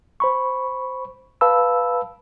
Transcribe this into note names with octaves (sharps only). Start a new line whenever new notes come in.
C5 B5 C#6
B4 F5 A5 B5 E6